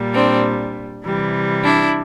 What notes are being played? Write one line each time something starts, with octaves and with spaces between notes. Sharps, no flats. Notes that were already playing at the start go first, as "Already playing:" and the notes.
Already playing: A#2 G3
C4 D4
C3 E3 G3
D4 E4